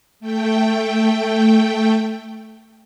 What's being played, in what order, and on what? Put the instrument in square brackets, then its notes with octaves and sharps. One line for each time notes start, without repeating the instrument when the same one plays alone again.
[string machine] A3 G5